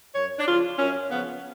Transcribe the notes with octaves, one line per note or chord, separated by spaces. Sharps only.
F#2 C#5
D4
C#3 F3 F4
F#2 C#4
C#3 F3 B3